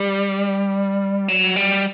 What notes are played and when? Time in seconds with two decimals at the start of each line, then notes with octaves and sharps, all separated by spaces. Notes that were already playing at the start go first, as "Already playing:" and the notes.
Already playing: G3
1.28 F#3
1.56 G3